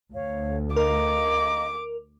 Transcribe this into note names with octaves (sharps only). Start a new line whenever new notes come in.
D2 C#5 F5
A#4 D#5 F5 A#5 D6